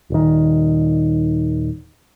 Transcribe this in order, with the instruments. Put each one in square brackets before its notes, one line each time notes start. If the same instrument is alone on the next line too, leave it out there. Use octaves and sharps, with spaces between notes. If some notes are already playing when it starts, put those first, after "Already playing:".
[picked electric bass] D#1 D#3